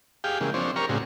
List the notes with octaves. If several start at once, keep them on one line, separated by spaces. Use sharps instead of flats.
G4 G#4 F5 G5
C#3 E3 G#3 A#3
F3 C4 D4 C5 C#5
G4 A#4 C#5 A#5 C#6 F6
A2 C#3 C4 D4 F#4 G#4